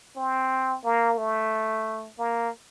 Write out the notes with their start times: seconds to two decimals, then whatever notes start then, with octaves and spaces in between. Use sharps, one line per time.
0.17 C4
0.84 A#3
1.18 A3
2.19 A#3